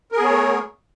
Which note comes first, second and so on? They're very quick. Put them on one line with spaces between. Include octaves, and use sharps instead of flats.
A#4 G#4 B3 C#5 A3